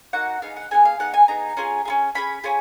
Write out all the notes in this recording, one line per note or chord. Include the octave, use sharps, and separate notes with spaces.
A#3 D#4 F#4 F#5
B3 D#4 G#4 F5
F#5
B3 D#4 G#4 G#5
F5
B3 D#4 G#4 F#5
G#5
B3 D#4 G#4 A#5
C#4 F4 G#4
C#4 F4 G#4
C#4 F4 G#4 B5
C#4 F4 G#4